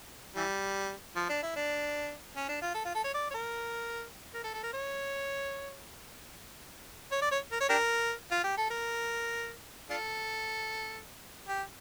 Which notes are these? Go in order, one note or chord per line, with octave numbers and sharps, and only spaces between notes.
E3 G3
F3
D4
E4
D4
C#4
D4
F4
A4
F4
A4
C#5
D5
C#5
A#4
A#4
A4
A4
A#4
C#5
C#5
D5
C#5
A#4
C#5
D4 G4 A#4
F4
G4
A4
A#4
D4 F4 A4
G4